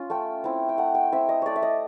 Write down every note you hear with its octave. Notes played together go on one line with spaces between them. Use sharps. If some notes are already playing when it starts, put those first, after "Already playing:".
Already playing: C#4 F4
A3 G5
C4 E4
G5
A3 F#5
G5
C4 E4 E5
D#5
A3 C#5 D5
E5
D#5